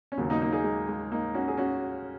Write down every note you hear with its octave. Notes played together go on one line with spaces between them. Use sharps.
C#4
D#2 C#3 F#3 A#3
A#3 D#4
A#3 D#4
D#4 G#4
G#3
G#3
A#3 D#4
C#4 F#4
G#4
C#4 F#4